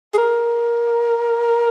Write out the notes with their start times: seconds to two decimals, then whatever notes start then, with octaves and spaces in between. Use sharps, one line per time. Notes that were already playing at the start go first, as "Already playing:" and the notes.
0.14 G#4
0.18 A#4